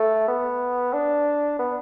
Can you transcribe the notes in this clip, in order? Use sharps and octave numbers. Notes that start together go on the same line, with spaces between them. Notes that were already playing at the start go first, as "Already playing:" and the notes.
Already playing: A3
B3
D4
B3